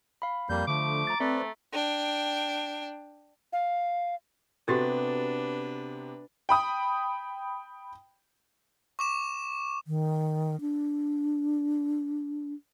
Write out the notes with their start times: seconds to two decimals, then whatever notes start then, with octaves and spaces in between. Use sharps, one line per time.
0.22 F5 B5
0.50 F2 G3 A#3 G6
0.68 D3 F3 A3 D6
1.07 A#5 A6
1.20 A3 C4 B4 D5
1.73 D4 G5
3.53 F5
4.68 C3 B3 D4 F#4 G4 A4 B4 A6
6.49 G5 B5 D#6
8.99 C#6 D6 E7
9.87 D#3
10.61 D4